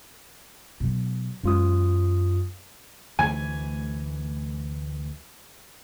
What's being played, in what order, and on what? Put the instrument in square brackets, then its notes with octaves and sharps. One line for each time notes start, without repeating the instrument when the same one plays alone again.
[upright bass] B2 F#3
[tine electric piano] F#2 F4 D#6 [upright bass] G#3 C#4
[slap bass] D2 E3 A3 [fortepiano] G#5